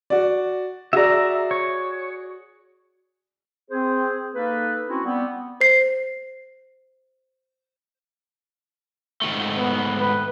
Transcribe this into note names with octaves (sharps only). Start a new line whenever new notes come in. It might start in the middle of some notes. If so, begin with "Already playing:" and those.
F#4 D5
F#4 G#4 D5 E5 A#5
C#5
C4 G#4 C5
A#3 D#4 A4 B4
C4 C#4 E4 F#4
G3 B3 C4
C5 C7
G#2 D#3 A3
B3
B4